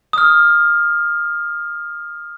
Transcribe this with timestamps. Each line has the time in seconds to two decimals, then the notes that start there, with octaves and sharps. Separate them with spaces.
0.13 D#6 F6